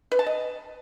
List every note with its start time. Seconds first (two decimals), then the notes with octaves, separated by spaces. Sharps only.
0.12 B4
0.19 A5
0.26 D#5